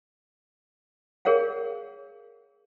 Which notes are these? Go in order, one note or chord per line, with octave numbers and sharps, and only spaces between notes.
G#4 A#4 C#5 F5 F#5